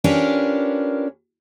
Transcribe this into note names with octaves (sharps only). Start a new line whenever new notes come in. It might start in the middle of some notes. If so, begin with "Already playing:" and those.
C#4 D4 F4 G4 A#4 B4